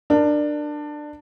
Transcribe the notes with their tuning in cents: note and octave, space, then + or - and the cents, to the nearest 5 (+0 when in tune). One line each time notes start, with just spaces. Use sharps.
D4 +20 A#4 +0